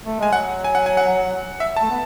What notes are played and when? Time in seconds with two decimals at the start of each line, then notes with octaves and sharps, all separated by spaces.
0.05 A3
0.19 G#3 G#5
0.32 F#3 F#5
0.64 G#5
0.75 F#5
0.86 G#5
0.97 F#5
1.60 E5
1.77 A5
1.82 A3
1.90 B3